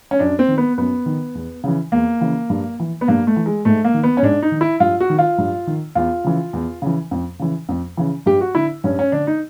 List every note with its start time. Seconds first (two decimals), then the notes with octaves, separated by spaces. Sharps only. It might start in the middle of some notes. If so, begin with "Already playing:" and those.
0.11 C#4
0.19 F#2 D4
0.39 C4
0.48 D#3
0.58 B3
0.78 F#2 B3
1.06 D#3
1.35 E2
1.64 C#3 E3
1.92 E2 A#3
2.21 C#3 E3
2.50 G2
2.80 E3
3.01 B3
3.08 G2 A#3
3.27 A3
3.36 E3
3.46 G#3
3.65 G#2 A3
3.84 A#3
3.94 D#3
4.03 B3
4.17 C#4
4.22 G#2 D4
4.42 D#4
4.52 D#3
4.61 E4
4.80 G2 F4
5.00 F#4
5.10 D#3
5.18 F4
5.38 G2
5.67 D#3
5.95 E2 F4
6.24 C#3 E3
6.53 E2
6.82 C#3 E3
7.11 F2
7.39 C#3 E3
7.69 F2
7.97 C#3 E3
8.26 G2 G4
8.41 F#4
8.55 D3 E4
8.84 G2 C#4
8.99 C#4
9.12 D3 D4
9.27 D#4